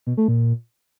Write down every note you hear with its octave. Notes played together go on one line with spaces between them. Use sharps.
B2
A3
A#2